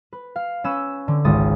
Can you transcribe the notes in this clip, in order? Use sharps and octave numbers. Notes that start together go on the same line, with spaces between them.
B4
F5
C#4 B4 E6 E7
D3
G#1 C#2 D#6 A6